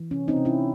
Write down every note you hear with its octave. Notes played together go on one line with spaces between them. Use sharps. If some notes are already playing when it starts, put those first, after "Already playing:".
Already playing: E3
C3 C#4
C4 D#4
C3
C#4 E4